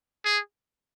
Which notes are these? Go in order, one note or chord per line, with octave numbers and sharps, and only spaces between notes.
G#4